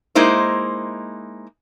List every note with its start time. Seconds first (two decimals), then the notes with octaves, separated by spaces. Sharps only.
0.15 G#3 A#3 D#4 E4 C5